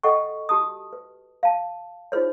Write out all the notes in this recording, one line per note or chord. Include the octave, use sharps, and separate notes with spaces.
A4 D#5 F#5 G5 C#6
F#4 G4 A5 D#6
B4
F5 A5
D#4 F4 G#4 C5 C#5